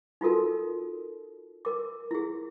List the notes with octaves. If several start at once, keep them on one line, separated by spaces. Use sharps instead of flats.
D#4 F4 F#4 A4 A#4
A#4 D6
E4 G#4